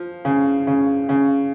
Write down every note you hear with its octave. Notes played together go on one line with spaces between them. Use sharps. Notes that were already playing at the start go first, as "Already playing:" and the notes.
Already playing: F3
C#3
C#3
C#3